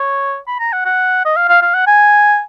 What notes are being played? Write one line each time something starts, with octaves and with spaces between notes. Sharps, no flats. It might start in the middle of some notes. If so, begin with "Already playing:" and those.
Already playing: C#5
B5
A#5
F#5
F#5
D#5
F5
F5
F5
F#5
G#5